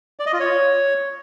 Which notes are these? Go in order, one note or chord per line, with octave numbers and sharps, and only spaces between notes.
D5
D#5
F4
C#5